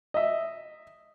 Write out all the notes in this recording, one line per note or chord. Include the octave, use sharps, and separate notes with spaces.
D#5 E5